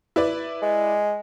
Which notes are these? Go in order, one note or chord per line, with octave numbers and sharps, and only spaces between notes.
E4 B4 D5
G#3